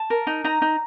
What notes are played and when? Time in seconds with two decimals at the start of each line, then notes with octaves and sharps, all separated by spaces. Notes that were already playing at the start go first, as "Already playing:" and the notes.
Already playing: A5
0.10 A#4
0.27 D#4
0.44 D#4 A#5
0.62 D#4